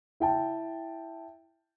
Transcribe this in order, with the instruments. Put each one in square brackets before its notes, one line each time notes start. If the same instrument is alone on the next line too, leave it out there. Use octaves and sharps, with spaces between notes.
[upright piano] E4 G5 A5